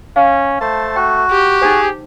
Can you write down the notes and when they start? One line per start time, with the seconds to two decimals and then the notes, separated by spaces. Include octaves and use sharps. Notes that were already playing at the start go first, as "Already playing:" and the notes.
0.16 C#4 F5
0.61 A3 C5 A5
0.96 F#4 G5
1.31 G4
1.62 D#4 G#4 C5